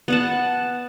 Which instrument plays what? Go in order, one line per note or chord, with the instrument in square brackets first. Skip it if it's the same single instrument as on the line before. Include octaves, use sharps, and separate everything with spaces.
[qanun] B3 F#5 A5